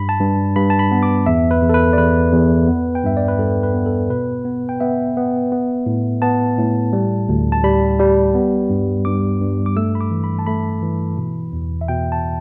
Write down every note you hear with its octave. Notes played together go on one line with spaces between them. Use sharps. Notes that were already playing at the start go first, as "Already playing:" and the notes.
Already playing: G2 B5
A5
G2
G2 B5
A5
B5
B3
D6
E2 E5
B4
E2
A4
B4
D5
E2 B4
E2
B3
G5
G2 E5
D5
B4
G2 A4
B4
B3
A4
B2 B4
B3
G5
B3 E5
B3
B3
A2
B3 A5
A2
G3
D2
A5
G3 B5
G3
B3
G2
G2 D6
G2
D6
A3 E6
B5
D6
E3
B5
A5
A3 B5
E3
B2
E2
E5
B2 G5
A5